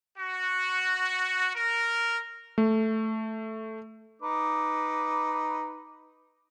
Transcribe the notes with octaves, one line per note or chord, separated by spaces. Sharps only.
F#4
A#4
A3
D#4 B4 D6